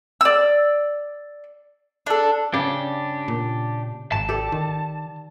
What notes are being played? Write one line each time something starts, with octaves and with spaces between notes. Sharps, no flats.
D5 E6
D4 A4
C#3 D4 G4
A#2
G#1 A5
G4 A4 D5
D#3